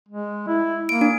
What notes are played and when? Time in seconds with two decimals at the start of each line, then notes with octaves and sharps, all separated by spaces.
0.08 G#3
0.48 E4
0.89 A#3 D7
1.01 D4